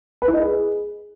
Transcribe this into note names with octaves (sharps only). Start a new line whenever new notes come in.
B4
E4
D#5
G#4